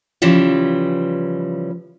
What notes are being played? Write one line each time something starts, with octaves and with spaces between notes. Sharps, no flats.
C#3 E3 F3 G3